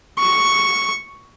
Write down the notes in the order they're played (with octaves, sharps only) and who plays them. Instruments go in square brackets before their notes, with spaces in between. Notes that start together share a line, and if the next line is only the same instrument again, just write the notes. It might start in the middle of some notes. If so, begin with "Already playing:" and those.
[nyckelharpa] C#6